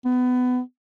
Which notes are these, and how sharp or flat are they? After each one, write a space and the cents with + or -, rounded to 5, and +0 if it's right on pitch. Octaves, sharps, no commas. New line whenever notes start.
B3 +20